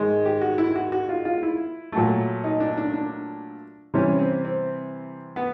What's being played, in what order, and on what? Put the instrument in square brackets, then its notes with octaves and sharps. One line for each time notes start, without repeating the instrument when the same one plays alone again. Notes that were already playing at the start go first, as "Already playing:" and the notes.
Already playing: [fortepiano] G#2 D#3 G#3
G4
F#4
E4
F#4
F#4
F4
F4
E4
A#2 F#3 A3
D#4
D4
D4
D4
C3 E3 G3 C#4
C4
C4
B3